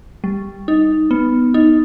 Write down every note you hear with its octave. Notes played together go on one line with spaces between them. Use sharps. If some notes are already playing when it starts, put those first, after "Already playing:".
G3
D#4
B3
D#4